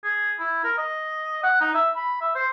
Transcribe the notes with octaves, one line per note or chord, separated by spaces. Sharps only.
G#4
E4
A#4
D#5
F#5
D#4
E5
B5
E5
C5